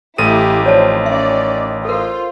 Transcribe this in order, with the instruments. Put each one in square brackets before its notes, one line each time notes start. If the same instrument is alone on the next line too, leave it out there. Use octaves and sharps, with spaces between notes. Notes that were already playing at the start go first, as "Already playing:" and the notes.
[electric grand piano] A1 D#7 [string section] A3 E4 [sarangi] G4 [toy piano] A4
[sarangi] D#3 [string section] F3 C4 [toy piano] C#5 D5 A5
[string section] C#4 D5 [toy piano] E5
[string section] F4 [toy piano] A4 A#4 [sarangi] C5